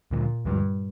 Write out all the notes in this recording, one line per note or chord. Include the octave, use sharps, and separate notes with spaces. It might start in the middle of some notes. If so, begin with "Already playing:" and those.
D2 A#2 D3 F3 G#3
D2 G2 D3 F3 G#3